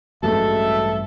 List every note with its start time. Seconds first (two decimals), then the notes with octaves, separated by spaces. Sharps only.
0.23 A1 G2 F#3 G#3 A3 C#4 A4 E5